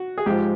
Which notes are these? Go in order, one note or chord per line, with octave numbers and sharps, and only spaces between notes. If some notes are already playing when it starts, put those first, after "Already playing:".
Already playing: F#4
G#4
G#2 F3 G4